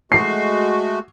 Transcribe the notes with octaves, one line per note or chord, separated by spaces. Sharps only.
G#3 A3 F#4 C7